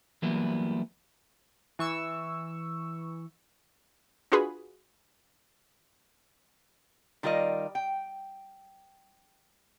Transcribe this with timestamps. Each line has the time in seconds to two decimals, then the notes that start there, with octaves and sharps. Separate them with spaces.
0.22 E3 F#3 G3 A#3 B3 E4
1.79 E3 C#6 E6
4.32 D4 F4 F#4 G#4 B4 B5
7.23 D#3 G3 F4 A#4 D5 D#5
7.75 G5